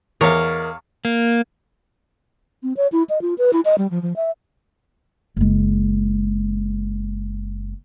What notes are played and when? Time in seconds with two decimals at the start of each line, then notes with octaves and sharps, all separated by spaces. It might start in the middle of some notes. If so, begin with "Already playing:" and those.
0.21 E2 A#4 C#5 D#5 F5
1.05 A#3
2.63 C4
2.77 C#5
2.92 E4
3.09 D#5
3.21 F4
3.38 B4
3.53 E4
3.65 D#5
3.78 G3
3.91 F3
4.02 F3
4.16 E5
5.37 F#1 G#3